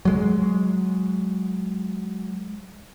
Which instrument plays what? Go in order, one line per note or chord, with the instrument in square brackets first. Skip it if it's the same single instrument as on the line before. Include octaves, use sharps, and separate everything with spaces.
[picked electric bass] F#3 G#3